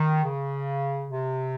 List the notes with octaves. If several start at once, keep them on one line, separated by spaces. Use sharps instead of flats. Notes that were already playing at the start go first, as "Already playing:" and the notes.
Already playing: D#3
C#3
C3